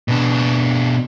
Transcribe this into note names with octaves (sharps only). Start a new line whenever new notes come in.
B2 D4